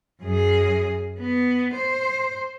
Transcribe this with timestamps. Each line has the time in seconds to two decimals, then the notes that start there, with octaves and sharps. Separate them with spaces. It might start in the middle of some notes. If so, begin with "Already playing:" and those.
0.21 F#2 G#4
1.20 B3
1.74 C5